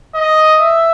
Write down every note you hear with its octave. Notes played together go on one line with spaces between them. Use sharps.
D#5
E5